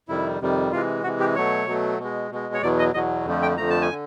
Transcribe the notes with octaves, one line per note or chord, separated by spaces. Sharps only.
F2 C3 D#3 G3 E4
F2 C3 D#3 G3
C3 E3 G#3 F4
C3 E3 G#3 F#4
G4
B2 F#3 A3 C#5
B2 F#3 A3
B2
G#3
B2 G#3
C#5
E2 B2 F#3 D5
D#5
E2 B2 F#3 D#5
F2 D3 F3 A3
G5
F2 D3 F3 A3 A#5
A5
G#5
D3